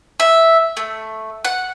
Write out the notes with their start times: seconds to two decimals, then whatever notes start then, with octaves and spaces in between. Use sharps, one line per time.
0.20 E5
0.77 A3
1.45 F#5